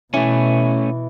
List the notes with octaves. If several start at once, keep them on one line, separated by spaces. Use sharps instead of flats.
B2 E3 A3 C#4